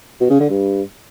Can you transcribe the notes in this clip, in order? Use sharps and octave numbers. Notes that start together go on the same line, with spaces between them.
B2
C#3
D3
G2